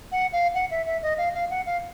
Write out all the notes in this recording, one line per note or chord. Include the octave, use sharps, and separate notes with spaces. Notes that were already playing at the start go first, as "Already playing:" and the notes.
F#5
F5
F#5
E5
E5
D#5
F5
F5
F#5
F5